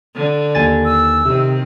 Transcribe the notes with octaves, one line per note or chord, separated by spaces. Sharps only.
D3
D#2 G#5 A6
E6
C3 D#3 C4